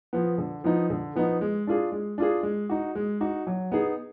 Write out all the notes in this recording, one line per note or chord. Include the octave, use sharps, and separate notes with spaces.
F3 B3
D3
F3 B3 D#4
D3
F3 B3 D#4
G#3
D4 F4 G#4
G#3
D4 F4 G#4
G#3
D#4 F#4
G#3
D#4 F#4
F#3
B3 D#4 G#4